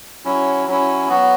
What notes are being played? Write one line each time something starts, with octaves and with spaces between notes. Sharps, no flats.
F#3 C#4 E4
F#3 C#4 E4
F#3 B3 F#4